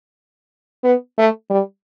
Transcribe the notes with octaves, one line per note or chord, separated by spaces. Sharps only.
B3
A3
G3